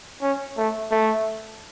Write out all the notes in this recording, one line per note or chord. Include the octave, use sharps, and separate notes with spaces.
C#4
A3
A3